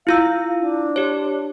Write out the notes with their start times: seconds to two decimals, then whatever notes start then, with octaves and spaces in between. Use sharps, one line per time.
0.07 E4 F4 F5 E6
0.59 D4
0.96 G4 C#5